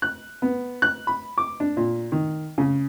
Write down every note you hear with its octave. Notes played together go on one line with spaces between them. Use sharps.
F#6
B3
F#6
B5
D6
D4
A#2
D#3
C#3